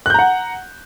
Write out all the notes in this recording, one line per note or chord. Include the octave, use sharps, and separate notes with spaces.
F#5 A#5 F#6 G6